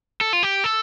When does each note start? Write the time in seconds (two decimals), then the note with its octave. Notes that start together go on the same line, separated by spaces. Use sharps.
0.21 A4
0.33 F4
0.43 G4
0.64 A4